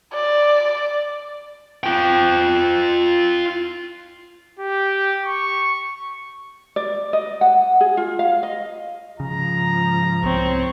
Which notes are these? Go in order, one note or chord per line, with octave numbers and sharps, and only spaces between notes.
D5
F4 G5
G4
C#6
D5
D#5
F#5
G#4
F4
F5
D#5
G#2 C#3 F3 A#5
C2 C4 C#5